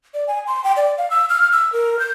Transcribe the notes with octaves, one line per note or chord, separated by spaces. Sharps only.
D5
G#5
C6
G5
D5
F5
E6
F6
E6
A#4
G6